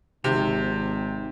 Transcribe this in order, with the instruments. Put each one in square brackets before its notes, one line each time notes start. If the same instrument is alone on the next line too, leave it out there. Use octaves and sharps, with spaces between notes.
[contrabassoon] G#1 [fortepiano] C3